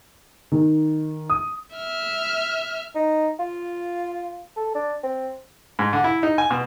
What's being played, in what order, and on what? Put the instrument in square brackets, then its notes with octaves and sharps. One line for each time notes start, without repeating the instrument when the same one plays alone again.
[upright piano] D#3
D#6
[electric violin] E5 F6
[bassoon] D#4
F4
A4
D4
C4
[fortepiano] G#2
D3
E4
D#4
G#5
B2